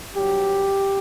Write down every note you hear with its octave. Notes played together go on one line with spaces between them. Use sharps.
G2 F#3 G4